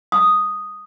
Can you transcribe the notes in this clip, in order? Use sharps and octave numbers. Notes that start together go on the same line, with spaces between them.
D#6